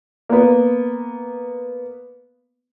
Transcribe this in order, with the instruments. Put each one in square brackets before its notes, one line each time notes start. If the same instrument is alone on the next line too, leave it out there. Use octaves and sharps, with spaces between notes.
[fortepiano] A#3 B3